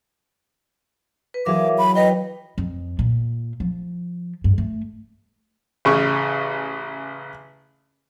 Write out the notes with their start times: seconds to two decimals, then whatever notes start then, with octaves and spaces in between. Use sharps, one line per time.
1.34 B4
1.46 E3 F#3 G#4 A#4 E5 F5 D6
1.78 B5
1.95 B4 D#5 G5
2.58 F2
2.99 A#2
3.60 F3
4.44 G2
4.58 A3
5.85 A1 C#3 C#6